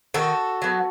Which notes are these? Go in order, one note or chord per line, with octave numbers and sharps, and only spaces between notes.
D#3 F#4 A4
F#3 B3